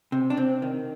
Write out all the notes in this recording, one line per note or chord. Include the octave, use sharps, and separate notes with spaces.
C3
D4
C3 C4
D#3